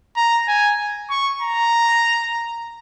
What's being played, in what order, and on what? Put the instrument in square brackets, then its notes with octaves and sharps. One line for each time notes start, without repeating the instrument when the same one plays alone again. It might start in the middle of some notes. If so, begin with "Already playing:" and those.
[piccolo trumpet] A#5
G#5
C#6
A#5